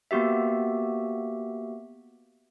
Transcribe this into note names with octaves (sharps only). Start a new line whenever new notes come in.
A#3 B3 F#4 G4 E5